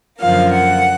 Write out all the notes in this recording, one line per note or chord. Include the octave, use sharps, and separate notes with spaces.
F#2 D3 F3 A#3 F5
F#5